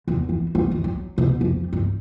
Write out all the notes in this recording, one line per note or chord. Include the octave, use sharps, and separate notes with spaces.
E2
E3
G3
D#3
F#3
B2
F2
G2